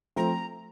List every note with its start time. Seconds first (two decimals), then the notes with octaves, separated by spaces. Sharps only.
0.16 F3 A3 C4 A#5